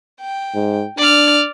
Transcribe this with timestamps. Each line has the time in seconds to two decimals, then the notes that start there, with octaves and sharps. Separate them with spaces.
0.20 G5
0.54 G#2
0.98 D4 D5 F6